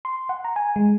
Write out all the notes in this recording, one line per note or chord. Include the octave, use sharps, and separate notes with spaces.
C6
F#5
A#5
G#5
G#3